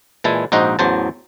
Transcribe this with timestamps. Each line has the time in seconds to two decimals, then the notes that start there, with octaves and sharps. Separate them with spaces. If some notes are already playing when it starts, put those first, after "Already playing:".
0.24 A#2 E3 G#3 E4 A5
0.52 A#1 G#2 D#4 F#4 C5 D#5
0.79 A1 E2 F#3 C5 A5